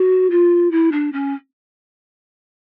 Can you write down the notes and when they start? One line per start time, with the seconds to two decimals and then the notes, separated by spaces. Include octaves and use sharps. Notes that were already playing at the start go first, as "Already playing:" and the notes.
Already playing: F#4
0.30 F4
0.71 E4
0.92 D4
1.13 C#4